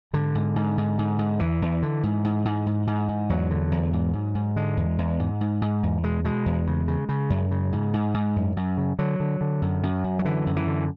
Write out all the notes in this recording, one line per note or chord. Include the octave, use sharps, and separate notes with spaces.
G#2 D3
G#2
G#2
G#2
G#2
G#2
E2 E3
E2
D3
G#2
G#2
G#2
G#2
G#2
G#2
E2 F#3
D3
E2
G#2
G#2
G#2
D3 G#3
E2
E2
G#2
G#2
G#2
E2
B2 G#3
B2 G#3
E2
C#3
C#3
C#3
F#2
C#3
G#2
G#2
G#2
F#2
F#2
C#3
D3 F#3
D3
D3
F#2
F#2
F#2
F#3
D3 E3
F#2
E3
D3